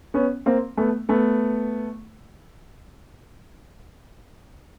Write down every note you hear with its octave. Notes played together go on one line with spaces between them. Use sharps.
B3 C#4
A#3 C4
A3 B3
A3 B3